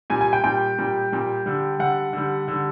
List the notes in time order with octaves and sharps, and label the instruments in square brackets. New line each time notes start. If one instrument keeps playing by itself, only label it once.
[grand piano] A#2 G3 G#5
G#5
G5
A#2 G3 G5
A#2 G3
A#2 G3
D3 G3
D3 G3 F#5
D3 G3
D3 G3